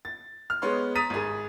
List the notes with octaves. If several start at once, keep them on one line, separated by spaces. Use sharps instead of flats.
A6
F6
G#3 B3 C#5 C6
A#5 D#6 A6 B6 D#7
G#1 G#4